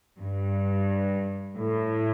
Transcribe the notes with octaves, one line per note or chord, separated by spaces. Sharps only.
G2
A2